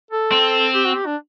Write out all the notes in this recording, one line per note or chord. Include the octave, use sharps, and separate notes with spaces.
A4
C4
G4
F#4
G4
D4